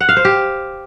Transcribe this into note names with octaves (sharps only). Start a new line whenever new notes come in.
F#5
F5
C5
G4